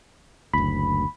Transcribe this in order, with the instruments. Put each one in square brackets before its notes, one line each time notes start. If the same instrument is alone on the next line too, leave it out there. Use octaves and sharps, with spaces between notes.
[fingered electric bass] F#1 D2 [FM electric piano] B5